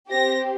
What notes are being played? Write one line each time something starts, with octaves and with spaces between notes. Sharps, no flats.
C4 G4 A#6